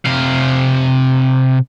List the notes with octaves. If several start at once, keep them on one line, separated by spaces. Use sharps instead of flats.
C3 F5